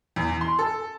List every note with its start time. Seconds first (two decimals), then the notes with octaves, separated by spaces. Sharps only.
0.16 E2
0.41 C6
0.59 A4